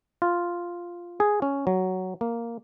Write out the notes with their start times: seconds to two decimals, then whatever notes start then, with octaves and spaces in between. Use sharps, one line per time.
0.22 F4
1.20 G#4
1.42 C#4
1.67 F#3
2.21 A#3